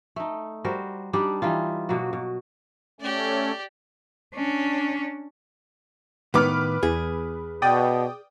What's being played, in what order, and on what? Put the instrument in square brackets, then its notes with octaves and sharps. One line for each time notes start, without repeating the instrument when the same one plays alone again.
[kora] A3 D#4
G3 F#4 A#4 C5
G3 D4 D#4 G4
E3 G3 D#4 F4
B2 F#3 A#3 F#4
B2
[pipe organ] A3 C#4 [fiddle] G4 D5
[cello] C#4 D4
[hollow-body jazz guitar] A2 D#3 B3 [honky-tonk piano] B4 D6 F6
[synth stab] E2 [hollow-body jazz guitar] G#4
[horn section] B2 [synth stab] D5 G5 D#6